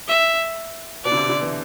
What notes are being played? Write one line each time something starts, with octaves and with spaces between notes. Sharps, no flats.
E5
B2 D5
D3
C3
D3
E3